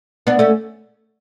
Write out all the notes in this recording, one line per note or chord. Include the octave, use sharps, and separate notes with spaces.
B3 D4
A3 C#4